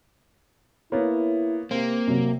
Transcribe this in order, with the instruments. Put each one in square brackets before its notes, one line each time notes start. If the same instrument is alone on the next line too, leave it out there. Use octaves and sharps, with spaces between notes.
[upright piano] A#3 B3 [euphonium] E4 [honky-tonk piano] C#5
[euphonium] C3 [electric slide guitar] A#3 [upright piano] C4
[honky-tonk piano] C3 [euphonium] F#3